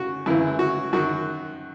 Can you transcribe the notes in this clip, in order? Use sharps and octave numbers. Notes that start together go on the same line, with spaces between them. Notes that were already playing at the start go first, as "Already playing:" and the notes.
Already playing: C#3 F#4
F#2 C#3 E3 E4
F#4
F#2 D#3 F#4